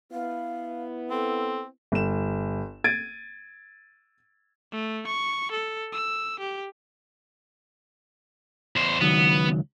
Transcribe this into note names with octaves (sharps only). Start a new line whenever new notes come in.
B3 E4 F5
C4 A4
G1 E7
G#6 A6 D7 D#7
A3
C#6
A4
E6
G4
E2 C5
C#2 D#3 F#3 B3